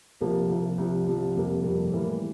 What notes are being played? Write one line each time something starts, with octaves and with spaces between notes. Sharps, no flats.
C2 C3 F3 A#3
C2 C3 F3 A#3
C2 C3 F3
C2 C3 F3
F2 C3 G3 A#3
F2 C3 G3 A#3
A2 E3 G3 A#3